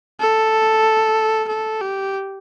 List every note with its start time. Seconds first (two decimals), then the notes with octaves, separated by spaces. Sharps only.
0.20 A4
1.48 A4
1.81 G4